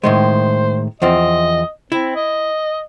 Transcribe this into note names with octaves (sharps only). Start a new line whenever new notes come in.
A2 D#3 G#3 C5
E2 F3 C4 D#5
C4 E4
D#5